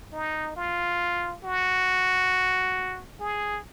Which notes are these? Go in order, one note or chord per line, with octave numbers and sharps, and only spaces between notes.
D#4
F4
F#4
G#4